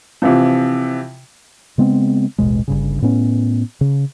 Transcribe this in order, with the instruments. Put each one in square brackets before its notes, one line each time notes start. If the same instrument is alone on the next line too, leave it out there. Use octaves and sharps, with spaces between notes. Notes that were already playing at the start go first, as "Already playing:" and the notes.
[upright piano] C3 E3 F3
[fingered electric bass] C#3 G#3 B3 C4
A1 D#2 B2 G#3
G1 G2 C#3
A2 B3 C#4
C#3